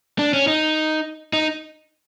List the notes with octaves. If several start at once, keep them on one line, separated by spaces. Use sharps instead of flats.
D4
C#4
D#4
D#4